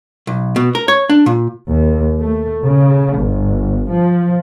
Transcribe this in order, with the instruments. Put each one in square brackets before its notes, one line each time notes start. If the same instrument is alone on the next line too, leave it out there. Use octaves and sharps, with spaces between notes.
[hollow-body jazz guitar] B1
B2
A#4
C#5
D4
A#2
[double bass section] D#2
A3
C#3
G1
F3